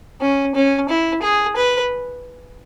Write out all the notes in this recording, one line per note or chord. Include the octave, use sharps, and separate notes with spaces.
C#4
C#4
E4
G#4
B4